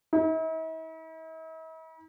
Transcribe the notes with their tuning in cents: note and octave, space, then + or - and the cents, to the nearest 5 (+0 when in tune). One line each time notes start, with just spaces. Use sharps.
E4 -45